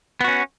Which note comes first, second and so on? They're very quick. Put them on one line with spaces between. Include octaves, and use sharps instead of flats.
B3 F#4 C#4